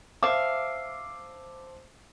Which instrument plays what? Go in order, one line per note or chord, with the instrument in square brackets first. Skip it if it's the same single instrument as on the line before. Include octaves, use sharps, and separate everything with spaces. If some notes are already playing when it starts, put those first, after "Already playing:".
[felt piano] C5 A5 D6 [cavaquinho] E5 F5